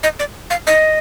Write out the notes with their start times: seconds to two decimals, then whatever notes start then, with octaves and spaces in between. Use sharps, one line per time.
0.03 D#5
0.19 D5
0.50 F5
0.67 D#5